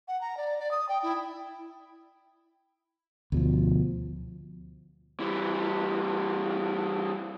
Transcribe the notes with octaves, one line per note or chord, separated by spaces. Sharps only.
F#5
A#5
D5
D5
D#6
G5
E4
D2 B2 F3
E3 G3